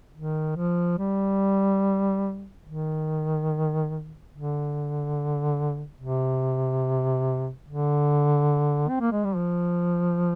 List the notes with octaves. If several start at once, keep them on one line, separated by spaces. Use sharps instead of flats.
D#3
F3
G3
D#3
D3
C3
D3
C4
A#3
G#3
G3
F3